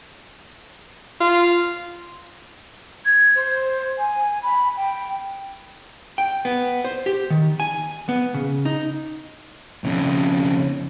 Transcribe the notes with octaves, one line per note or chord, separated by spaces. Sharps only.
F4
G#6
C5
G#5
B5
G5
G5
B3
C5
G4
D#3
G#5
B3
C#3
D#4
F2 C#3